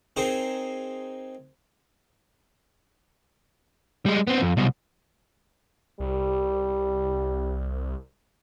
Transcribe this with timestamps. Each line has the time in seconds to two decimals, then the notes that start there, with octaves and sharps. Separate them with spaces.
0.16 C4 D#4 G#4 A#4 C5
4.06 G3 G#3
4.27 B3 C4
4.42 F2
4.57 C2 B2
6.00 C2 G3